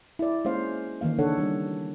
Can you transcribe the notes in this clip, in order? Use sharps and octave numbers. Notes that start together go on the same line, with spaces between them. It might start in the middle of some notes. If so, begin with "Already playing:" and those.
E4 D5
G#3 A#3 C#4 C5 F5
D#3 E3 A#3 F5
C#3 D4 A4 C#5 F#5
G3 D4